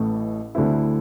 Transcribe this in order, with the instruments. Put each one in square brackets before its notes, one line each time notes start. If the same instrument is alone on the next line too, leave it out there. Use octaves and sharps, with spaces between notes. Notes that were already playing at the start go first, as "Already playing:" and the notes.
Already playing: [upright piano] A1 A2 E3 A3
D2 D3 A3 C4 E4